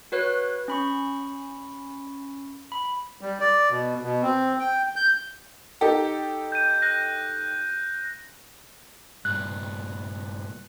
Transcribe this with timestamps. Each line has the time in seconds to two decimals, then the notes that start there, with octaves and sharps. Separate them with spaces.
0.12 F#4 B4 C#5 F#6
0.68 C#4 B5 C#6
2.72 B5
3.21 G3
3.40 D5
3.70 B2
4.02 B2
4.22 C4
4.59 G5
4.96 G6
5.81 D#4 G4 A4
6.52 G6 D#7
6.82 F#6 A#6
9.25 G2 A#2 F#6